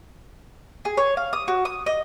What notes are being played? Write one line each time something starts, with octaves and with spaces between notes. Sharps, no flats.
G#4
C#5
F5
D#6
F#4
D#6
D#5